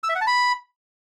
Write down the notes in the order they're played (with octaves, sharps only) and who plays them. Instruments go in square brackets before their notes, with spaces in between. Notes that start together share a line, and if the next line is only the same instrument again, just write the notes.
[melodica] E6
E5
F#5
A5
B5